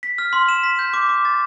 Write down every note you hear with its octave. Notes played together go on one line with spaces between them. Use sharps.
B6
F6
C6
E7
B6
G6
D6
D6
A6